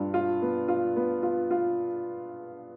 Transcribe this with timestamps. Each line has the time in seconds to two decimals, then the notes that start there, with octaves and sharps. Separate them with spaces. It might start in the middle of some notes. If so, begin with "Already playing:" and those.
Already playing: G2 F4
0.14 F4
0.42 B3
0.68 F4
0.96 B3
1.23 F4
1.51 F4